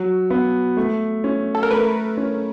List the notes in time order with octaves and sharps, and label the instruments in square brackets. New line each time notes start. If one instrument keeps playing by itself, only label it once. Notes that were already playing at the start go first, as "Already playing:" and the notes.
Already playing: [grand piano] F#3
B3
A3
C#4
[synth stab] A4
A#4
[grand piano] A3 [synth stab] B4
[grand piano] C#4